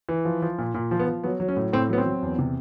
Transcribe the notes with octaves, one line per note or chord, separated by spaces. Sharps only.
E3
F3
F3
A#2
A#2
F3
B3
F3
F#3 B3
F#3
C#4
A2
A2 C4
F#3 B3
C4
F#3
E2
C3